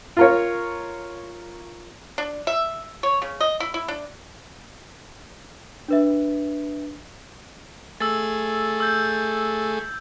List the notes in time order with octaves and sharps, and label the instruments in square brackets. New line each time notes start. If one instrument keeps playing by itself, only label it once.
[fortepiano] F4 A#4 C#5
[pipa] D4
E5
C#5
C#3
D#5
E4
E4
D4
[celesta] D4 B4 E5
[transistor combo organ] A3 G#4 [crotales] E6 A6
[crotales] E6 G6 A6